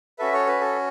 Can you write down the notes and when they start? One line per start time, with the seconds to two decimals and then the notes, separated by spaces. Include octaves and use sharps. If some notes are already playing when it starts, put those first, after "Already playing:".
0.19 C#4 F#4 A4 B4 E5
0.33 A4 C#5
0.47 B4
0.61 A4